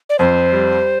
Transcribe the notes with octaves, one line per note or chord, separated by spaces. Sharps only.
D5
F2 C5
G3